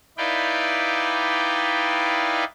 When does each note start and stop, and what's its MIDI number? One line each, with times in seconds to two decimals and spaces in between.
0.18 2.44 63
0.18 2.44 64
0.18 2.44 71
0.18 2.44 74
0.18 2.44 77
0.18 2.44 79